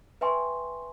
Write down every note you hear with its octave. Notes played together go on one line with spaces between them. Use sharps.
B4 E5 G5 G#5 C6 C#6